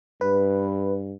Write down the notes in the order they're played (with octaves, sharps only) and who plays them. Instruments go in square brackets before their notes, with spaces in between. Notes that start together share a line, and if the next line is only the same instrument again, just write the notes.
[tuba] G2 [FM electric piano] B4